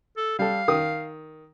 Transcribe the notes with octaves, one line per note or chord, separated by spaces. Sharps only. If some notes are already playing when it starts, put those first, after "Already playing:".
A4
G3 A4 F5
D#3 D#6